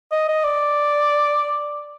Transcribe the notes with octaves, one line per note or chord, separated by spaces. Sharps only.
D#5
D#5
D5